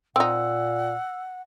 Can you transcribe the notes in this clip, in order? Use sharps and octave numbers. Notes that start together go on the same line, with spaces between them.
A#2 C4 D#4 F#5 E6